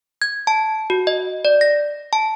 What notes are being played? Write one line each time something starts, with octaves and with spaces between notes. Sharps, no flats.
G#6
A5
F#4
D#5
D5
A#6
A5